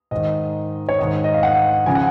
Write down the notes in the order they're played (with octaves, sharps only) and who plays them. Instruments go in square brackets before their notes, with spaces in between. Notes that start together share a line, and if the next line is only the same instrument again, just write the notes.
[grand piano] G#2 D#3 D#5
C#5
G#2 D#3 D#5
D#5
F5
F#5
C#3 F3 G#5
F#5